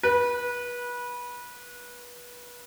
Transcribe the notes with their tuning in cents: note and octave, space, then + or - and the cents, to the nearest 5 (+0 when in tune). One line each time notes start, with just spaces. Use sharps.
B4 -25